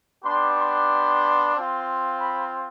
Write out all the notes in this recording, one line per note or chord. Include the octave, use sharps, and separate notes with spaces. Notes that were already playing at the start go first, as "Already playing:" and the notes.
B3 D4 G4 C6
C6
C4 F4
B5